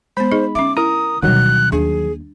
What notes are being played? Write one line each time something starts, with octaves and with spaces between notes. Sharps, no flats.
G#3 B3 C5 B5
D#4 G#4 D#5
D3 C#4 E5 D6
E4 A#4 A#5 D#6
D2 B2 D#3 F#3 G3 C#4 F#6
D#2 D4 G#4